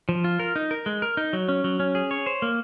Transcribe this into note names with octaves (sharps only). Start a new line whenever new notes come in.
F3
F4
A#4
D#4
A#4
G#3
A#4
D#4
F#3
C#4
F#3
C#4
G#4
C#5
C5
A#3